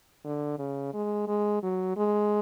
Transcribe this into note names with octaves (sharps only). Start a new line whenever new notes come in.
D3
C#3
G#3
G#3
F#3
G#3